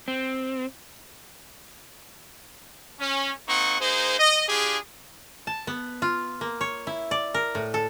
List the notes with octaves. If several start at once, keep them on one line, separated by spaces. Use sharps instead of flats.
C4
C#4
A#3 C4 D#4 F#5 C#6
A#3 D#4 G#4 C5
D#5
D4 F4 G4 G#4
A5
B3
F4
A#3
C#5
E4
D5
A#4
A2
A4